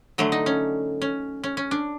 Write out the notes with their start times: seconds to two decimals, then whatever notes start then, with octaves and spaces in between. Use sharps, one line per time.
0.18 D3 F#3 A3
0.32 D#4
0.46 C#4
1.02 C#4
1.44 C#4
1.57 C#4
1.71 D4